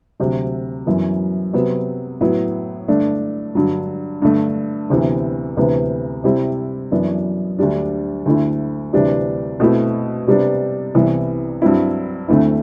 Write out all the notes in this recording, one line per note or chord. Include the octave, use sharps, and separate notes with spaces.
D2 C3 F#3
F#2 E3 B3
C3 F#3 B3
A2 F#3 B3 E4
G2 D3 A3 D4
G2 D3 F#3
G2 D3 A3
D2 C3 E3 B3
D2 C3 E3 B3
C3 G3 C4 E4
F#2 E3 B3 D4
D2 D3 G3 D4
D2 D3 A3 E4
D2 C3 E3 G3 D4
B2 A3 C4 E4
C3 G3 B3 D4
C2 C3 E3 B3
G2 F#3 C4 E4
D2 D3 A3 C4 E4